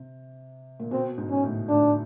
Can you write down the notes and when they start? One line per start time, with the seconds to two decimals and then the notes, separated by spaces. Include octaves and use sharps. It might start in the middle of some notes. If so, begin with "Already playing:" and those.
Already playing: C3
0.80 A#2
0.91 B2 C4
1.18 G#2
1.30 C#4
1.44 A2
1.68 A2 D4